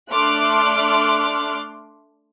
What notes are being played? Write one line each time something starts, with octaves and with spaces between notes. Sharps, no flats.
A3 D4 C6 D6 F6 F#6